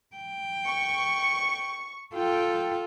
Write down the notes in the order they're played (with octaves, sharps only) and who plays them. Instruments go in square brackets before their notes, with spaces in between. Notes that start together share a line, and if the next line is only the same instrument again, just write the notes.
[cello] G5
[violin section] C#6
[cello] F4 A4 [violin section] G5